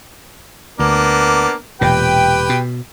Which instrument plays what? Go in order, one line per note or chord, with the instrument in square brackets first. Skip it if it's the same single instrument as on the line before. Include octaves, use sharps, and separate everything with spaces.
[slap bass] D2 [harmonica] A#3 B3 D4
[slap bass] E1 A#2 [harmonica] G4 B4 G5
[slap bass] B2